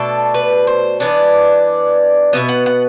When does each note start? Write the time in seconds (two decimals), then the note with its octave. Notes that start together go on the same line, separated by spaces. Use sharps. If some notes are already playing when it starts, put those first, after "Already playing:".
Already playing: B2 A3 D4 A4
0.34 B4
0.67 C5
1.00 E3 B3 D4 D5
2.33 B2 G3 B3 E5
2.49 F#5
2.66 F#5